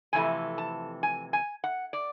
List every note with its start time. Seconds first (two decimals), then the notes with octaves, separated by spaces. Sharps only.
0.13 F2 C3 E3 A3 G#5
0.58 A5
1.03 G#5
1.33 G#5
1.64 F#5
1.93 D5